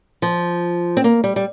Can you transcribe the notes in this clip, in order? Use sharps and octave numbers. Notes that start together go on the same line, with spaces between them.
F3
C4
A#3
G3
G3